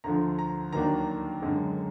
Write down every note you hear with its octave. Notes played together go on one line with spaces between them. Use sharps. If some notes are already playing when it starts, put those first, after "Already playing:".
D2 D3 F3 A#5
A#5
D#2 D#3 F#3 A#3 D4 A#5
F#2 D3 G#3